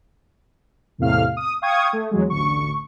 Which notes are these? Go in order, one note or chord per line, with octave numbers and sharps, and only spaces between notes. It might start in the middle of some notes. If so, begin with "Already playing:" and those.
A1 E2 A2 C3 F5 F6
D#6
F5 G5 C#6 D#6 G#6
A3
E2 F#3 G#3
A1 D2 C#6